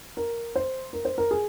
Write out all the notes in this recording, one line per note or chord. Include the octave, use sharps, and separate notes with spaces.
A#4
C5
A#4
C5
A#4
G#4